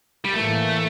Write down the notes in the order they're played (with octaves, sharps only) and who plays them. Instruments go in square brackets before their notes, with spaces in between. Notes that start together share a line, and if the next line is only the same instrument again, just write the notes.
[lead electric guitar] G3
[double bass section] A2 E3 A#3 [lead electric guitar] A3